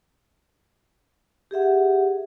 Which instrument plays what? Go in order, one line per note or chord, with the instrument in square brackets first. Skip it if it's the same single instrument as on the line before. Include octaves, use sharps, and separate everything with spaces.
[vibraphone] G4 G#4 E5 F#5